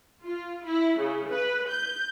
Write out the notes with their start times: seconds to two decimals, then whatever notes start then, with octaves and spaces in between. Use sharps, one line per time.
0.25 F4
0.66 E4
1.00 C#3
1.32 B4
1.70 G6